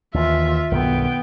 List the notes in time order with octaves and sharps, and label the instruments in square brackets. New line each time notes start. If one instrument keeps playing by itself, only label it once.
[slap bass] D#2 E3 [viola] F4 E5
[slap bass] B1 G2 D#3 [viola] B3 G5